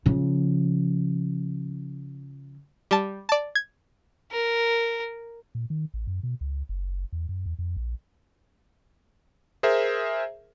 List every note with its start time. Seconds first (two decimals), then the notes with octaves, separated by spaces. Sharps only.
0.06 C#3 F3
2.91 G3 A5
3.29 D5 A5
3.55 G#6
4.31 A#4
5.55 A#2
5.70 D#3
5.94 A1
6.07 F#2
6.23 B2
6.41 C#2
6.69 F#1
7.13 E2
7.29 F#2
7.46 E2
7.59 F2
7.77 A#1
9.63 G#4 A#4 C5 E5